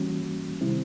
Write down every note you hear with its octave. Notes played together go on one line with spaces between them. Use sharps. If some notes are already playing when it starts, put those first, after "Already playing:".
Already playing: E3 G3 A#3 C#4 F#4
C3 D#3 G3 C4 E4